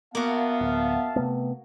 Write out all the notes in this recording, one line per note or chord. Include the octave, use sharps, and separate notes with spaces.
A#3 B3 F#4 E5 F5 A5
D1
C3 A3 B3